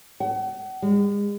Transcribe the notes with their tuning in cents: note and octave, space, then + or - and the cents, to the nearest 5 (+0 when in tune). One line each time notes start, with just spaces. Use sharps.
F#5 +40
G#3 -40